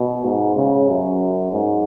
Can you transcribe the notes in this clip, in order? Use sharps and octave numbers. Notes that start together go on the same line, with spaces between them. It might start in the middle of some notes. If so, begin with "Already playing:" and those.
Already playing: B2
G#2
C#3
F#2
G#2